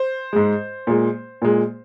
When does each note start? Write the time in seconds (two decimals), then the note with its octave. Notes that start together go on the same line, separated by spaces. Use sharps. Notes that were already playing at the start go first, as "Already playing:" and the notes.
Already playing: C5
0.33 G#2 G#3
0.87 A#2 G#3
1.42 A#2 G#3